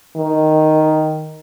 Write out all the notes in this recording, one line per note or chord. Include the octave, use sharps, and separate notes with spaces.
D#3